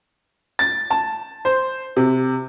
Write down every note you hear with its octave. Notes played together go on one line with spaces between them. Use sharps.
A6
A5
C5
C3